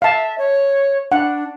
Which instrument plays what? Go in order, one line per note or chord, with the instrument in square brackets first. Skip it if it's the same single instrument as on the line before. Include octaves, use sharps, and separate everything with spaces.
[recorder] E5 [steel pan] F5 A5
[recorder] C#5
[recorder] D4 [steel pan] F#5